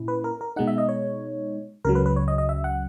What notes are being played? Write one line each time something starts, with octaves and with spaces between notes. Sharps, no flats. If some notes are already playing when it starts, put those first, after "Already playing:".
Already playing: A#2 C#4 E4
B4
A#4
A#4
B2 G#3 D#4 F#5
E5
D#5
C#5
C#2 C#3 F#3 A#4
B4
B4
C#5
D#5
D#5
E5
F#5